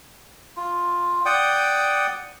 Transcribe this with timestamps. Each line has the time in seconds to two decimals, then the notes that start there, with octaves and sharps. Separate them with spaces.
0.57 F4
1.26 D5 F#5 G5 D#6